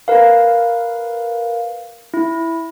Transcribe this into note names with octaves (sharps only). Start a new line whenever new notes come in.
A#4 B4 F5
E4